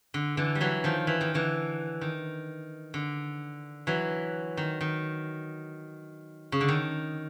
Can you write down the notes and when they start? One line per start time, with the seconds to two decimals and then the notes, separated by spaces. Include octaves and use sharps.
0.14 D3
0.37 D3 E3
0.55 G3
0.61 E3 F#3
0.84 D#3 F3
1.07 E3
1.21 D#3
1.34 D3 E3
2.01 D#3
2.94 D3
3.87 E3 F#3
4.57 D#3
4.81 D#3
6.52 C#3
6.61 D3
6.68 D#3